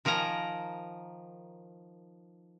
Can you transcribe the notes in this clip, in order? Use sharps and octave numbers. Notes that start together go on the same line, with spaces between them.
D#3 F3 A#4 G#5 A#5